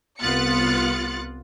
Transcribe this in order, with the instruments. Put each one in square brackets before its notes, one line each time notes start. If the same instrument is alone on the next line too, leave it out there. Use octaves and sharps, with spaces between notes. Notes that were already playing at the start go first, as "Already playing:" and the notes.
[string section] C2 B3 F4 F#6 A6 C#7